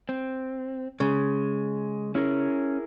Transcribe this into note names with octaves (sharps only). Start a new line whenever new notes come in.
C4
C#3 G#3
C#4 E4 G#4 A#4